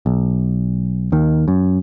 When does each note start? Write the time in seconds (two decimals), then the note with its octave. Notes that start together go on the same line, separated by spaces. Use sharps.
0.06 B1
1.12 D#2 D#3
1.48 F#2